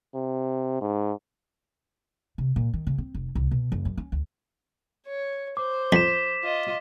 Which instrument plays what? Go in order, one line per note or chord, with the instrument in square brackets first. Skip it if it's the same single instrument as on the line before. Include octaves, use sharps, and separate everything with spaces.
[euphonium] C3
G#2
[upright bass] C3
A#2
D#3
C#3
C4
F1
C2
B2
F#1
F#2
C#4
D2
[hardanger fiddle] C#5
[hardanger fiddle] C5 [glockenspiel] D6
[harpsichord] F2 [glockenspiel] B6 E7
[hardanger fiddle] F4 D#5